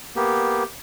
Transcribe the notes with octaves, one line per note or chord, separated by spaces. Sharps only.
A#3 B3 G4